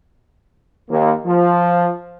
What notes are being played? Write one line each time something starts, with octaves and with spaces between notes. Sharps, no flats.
D#2 A#3
F3